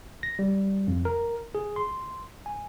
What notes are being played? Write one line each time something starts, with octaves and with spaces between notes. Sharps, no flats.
A#6
G3
F2
A#4
G#4
C6
G#5